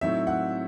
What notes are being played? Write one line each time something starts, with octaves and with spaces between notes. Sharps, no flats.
A2 F#3 C4 D#4 E5
F#5